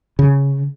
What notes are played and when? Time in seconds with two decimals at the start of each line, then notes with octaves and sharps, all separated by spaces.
0.19 C#3